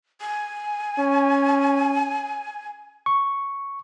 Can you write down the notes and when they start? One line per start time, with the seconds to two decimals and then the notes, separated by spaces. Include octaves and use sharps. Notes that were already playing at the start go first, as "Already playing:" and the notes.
0.21 G#5
0.98 C#4
3.06 C#6